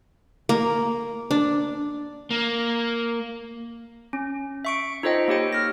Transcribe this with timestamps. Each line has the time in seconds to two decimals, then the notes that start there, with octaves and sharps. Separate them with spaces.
0.49 A#3
1.31 D4
2.31 A#3
4.13 C#4
4.65 E5 C#6 D7
5.03 D#4 F4 A4 C5 D#5 G5
5.28 A#3 G4 C#5 G5
5.53 F6 A#6